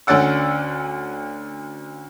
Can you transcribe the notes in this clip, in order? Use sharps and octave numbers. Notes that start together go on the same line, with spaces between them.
D2 D3 C#4 D5 F#5 E6